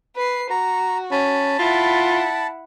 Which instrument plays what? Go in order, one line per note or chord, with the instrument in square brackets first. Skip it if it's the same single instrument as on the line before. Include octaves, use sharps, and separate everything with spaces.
[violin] B4 C7
[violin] F#4 [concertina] A#5
[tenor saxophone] C#4 [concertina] A5 B5
[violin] E4 F#5 [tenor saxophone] F4